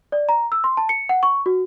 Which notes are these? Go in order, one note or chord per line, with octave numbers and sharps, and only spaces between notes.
D5
A#5
E6
C6
A5
C#7
F#5
C#6
F#4